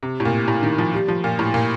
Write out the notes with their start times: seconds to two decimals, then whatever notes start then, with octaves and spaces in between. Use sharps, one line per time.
0.03 C3
0.20 A2
0.25 A#2
0.48 A2
0.63 D#3
0.78 F3
0.93 G3
1.08 F3
1.24 A#2
1.39 A2
1.54 A#2